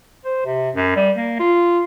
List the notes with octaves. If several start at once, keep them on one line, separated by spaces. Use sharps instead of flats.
C5
C3
F#2
G3
A#3
F4